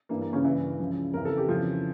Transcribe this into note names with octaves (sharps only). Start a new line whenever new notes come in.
G2 E3 A#3
A#3
C#3 C#4
G2 E3 E4
C#2 C#3 F3
F2 C#3 E3 A#4
A4
G4
F2 C#3 E3 F3 F4